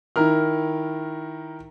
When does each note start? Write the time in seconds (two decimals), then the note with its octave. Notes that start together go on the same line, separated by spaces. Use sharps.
0.16 D#3 E4 A#4 F6